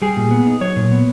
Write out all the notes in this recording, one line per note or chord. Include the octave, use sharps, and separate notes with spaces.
G3 G#4
A#2
B3
D#4
F#3 C#5
A#2
B3